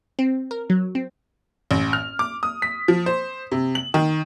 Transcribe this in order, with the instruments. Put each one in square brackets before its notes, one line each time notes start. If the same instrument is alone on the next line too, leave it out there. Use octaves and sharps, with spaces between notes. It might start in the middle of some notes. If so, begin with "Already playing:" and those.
[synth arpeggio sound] C4
A#4
F#3
C4
[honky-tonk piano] A1
F6
D6
D#6
B6
F3
C5
C3
F#7
D#3